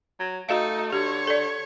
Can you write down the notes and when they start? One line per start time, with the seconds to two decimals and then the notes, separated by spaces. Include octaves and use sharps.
0.20 F#3
0.49 A3 D#4 F#4 D#5 F5
0.92 D3 G4 C#5
1.27 A4 D5